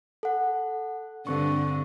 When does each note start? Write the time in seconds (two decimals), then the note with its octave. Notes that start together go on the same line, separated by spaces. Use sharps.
0.23 A4 F#5
1.27 G2 D3 C4 C#6